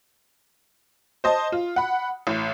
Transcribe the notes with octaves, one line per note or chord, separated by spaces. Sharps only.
C5 D#5 A5
F4
F#5 B5
A1